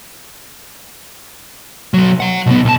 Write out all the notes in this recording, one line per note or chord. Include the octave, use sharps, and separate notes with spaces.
B1 F#3
C#5 F#5
B1 B3
B1 A5